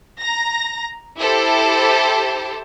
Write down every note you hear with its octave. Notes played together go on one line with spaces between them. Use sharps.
A#5 A#6
E4 G4 A4 C5